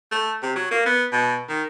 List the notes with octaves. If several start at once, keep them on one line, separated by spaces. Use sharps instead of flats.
A3
C3
F#3
A#3
B3
B2
D#3